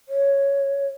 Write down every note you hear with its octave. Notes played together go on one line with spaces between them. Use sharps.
C#5